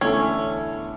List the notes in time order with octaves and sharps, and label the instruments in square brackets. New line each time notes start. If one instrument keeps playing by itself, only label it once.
[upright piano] E2 D3 A3 E4 A4 [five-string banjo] C#4